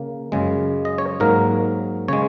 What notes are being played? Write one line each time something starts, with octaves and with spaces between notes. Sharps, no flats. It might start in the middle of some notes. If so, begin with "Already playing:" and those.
Already playing: C#3 A#3
F#2 C#3 G#3
D#5
C#5
G#2 F#3 A#3 A#4
C#3 G#3 C#5